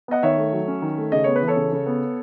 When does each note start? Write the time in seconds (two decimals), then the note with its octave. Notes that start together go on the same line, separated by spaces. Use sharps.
0.08 B3 D#5 F#5
0.23 D#3 C#5 E5
0.38 A3
0.53 F#3
0.68 C#4
0.82 D#3
0.98 A3
1.12 C#3 D#5
1.24 B3 C#5
1.36 B4
1.42 E3
1.47 A4 C#5
1.56 C#3
1.72 C#3
1.86 B3